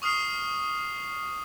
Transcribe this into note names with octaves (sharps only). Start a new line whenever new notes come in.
C#6 D#6 F6 C7 F7